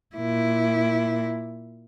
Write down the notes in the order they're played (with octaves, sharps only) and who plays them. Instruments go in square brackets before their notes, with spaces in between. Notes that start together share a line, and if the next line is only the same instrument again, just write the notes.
[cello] A#2 E4